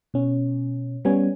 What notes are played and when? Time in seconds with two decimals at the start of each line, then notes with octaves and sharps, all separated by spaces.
0.14 B2 C#4
1.05 G3 B3 C#4 G#5